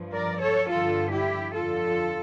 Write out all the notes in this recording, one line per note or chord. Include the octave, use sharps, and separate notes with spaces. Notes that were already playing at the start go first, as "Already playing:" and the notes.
Already playing: G2 F3
A#4 D5
A4 C#5
G2 D3 F3 F4 A4
E4 G4
F2 D3 F3 F4 A4